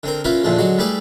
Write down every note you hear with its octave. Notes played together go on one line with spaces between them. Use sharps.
D3 C4 A#4
A#3 C#4 E4 F4 A#4 B4
E2 A#2 D3 E3 F3 G#3
D3 F#3 G#3 F#4
G3 A3 E4 G#4 B4 D5